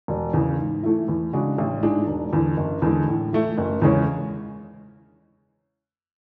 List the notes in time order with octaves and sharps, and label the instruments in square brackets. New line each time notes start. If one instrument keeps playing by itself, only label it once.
[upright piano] E1
E2 C#3
G#2
E3 A3 E4
E2
C#3 G#3 D4 F#4
A1
G#2 E3 G#3 D4
E1
E2 D3
F#1
E2 D3 G#3
A2
E3 A3 E4
F#1
E2 C#3 G#3 C#4